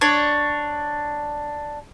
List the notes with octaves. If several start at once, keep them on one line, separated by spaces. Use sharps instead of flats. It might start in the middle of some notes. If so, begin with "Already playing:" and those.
D4 C#5